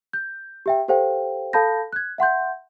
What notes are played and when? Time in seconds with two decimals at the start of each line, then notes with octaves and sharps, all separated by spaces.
0.13 G6
0.66 G4 E5 G5
0.88 G4 A4 C5 F5 G5
1.53 A4 F5 A5 B5 G6 A#6
1.93 F#6 G#6
2.18 E5 F#5 C6 G6